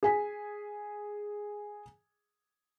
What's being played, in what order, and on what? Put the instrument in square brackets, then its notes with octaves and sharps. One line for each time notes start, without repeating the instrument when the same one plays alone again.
[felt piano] G#4 G#5 B6